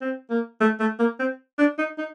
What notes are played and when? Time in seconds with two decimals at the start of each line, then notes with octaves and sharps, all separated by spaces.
0.01 C4
0.30 A#3
0.61 A3
0.80 A3
0.99 A#3
1.19 C4
1.58 D4
1.78 D#4
1.98 D#4